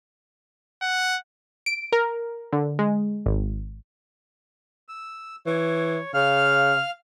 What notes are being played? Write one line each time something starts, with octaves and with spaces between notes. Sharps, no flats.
F#5
D7
A#4
D3
G#3
G#1
E6
E3 C#5
C#3 F5 F6